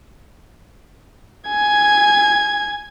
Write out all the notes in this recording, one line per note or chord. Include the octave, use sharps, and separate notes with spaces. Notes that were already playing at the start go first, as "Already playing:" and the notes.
G#5 G#6